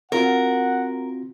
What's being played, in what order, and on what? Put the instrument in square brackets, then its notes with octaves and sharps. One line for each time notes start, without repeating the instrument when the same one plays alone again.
[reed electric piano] C4 F4 F#4 [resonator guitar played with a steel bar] A#4 [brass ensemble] F#5